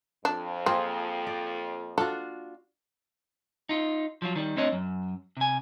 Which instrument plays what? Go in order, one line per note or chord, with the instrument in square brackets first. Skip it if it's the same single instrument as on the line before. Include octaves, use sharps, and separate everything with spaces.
[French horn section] F2 [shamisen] D4
[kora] A#3 F4 G#4 [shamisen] C4
[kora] D5
[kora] D4 F4 F#4 [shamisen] A4
[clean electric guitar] D#4 F4
F3 F#3 F4
D#3 G3
A3 C4 D4 C#5 D#5
F#2
C3 G#5